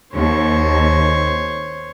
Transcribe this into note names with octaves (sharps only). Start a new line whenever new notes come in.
D#2 C5 C#5